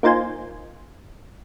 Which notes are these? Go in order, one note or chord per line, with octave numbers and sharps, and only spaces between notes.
A#3 D#4 F4 C5 G#5